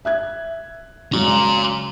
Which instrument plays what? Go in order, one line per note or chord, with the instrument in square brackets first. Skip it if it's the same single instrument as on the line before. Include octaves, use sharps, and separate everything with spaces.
[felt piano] E5 F#6 G#6
[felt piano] C#3 F#3 G#3 [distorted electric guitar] A#5 C6